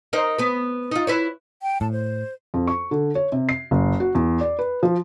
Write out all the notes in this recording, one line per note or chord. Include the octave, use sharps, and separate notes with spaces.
D#4 A#4 C5
B3 B4
D#4 F4
E4 B4 C#5
G5
A2 A5
C5
F2
C#6
D3
C#5
C3
C7
F#1
F#4
E2
D5
B4
F3